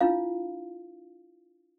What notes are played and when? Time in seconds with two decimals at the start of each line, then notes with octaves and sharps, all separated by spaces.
0.01 D4 E4 F4 F5